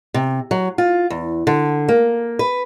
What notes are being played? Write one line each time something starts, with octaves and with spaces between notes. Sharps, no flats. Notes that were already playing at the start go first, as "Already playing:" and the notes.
C3
F#3
F4
E2
D3
A#3
B4